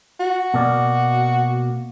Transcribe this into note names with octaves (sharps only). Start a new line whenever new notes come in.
F#4
B2 A#3 D5